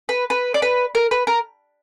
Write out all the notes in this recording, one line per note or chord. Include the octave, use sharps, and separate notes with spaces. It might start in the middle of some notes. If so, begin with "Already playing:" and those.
B4
B4
D5
B4
A#4
B4
A#4